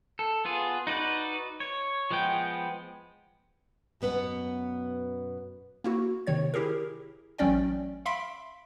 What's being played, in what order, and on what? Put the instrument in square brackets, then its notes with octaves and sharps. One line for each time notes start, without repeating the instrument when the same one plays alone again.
[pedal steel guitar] A4
B3 F4 G#4
D#4 F#4 B4 D5
C#5
F3 G#3 B3 G5
[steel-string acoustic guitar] F#2 B2 B3 B4 F#5
[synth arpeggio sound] A#3 E4 F#4
C3 D#3 C#5 G#6
E4 G4 G#4 A#4
A1 F#3 A3 C#4 D5 G5
E5 F5 B5 C6 B6 D7